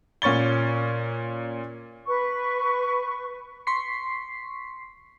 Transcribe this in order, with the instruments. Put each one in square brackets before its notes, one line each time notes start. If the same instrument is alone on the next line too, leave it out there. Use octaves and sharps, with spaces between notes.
[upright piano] A#2 C#4 C#6 A6 G7
[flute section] B4 C#6
[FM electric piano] C6 C#6 B6 C7